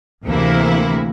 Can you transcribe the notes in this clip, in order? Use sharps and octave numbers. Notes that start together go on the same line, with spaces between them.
D2 C3 E3 A#3 E4